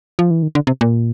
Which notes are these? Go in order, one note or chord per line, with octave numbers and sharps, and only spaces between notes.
F3
E3
D#3
D3
C3
A#2